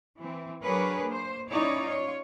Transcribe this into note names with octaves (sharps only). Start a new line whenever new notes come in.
E3 C4
F#3 D4 G#4 A#4 B4 C#5
A#3 C5
C#4 D#4 E4 C#5 D5
F4 C#5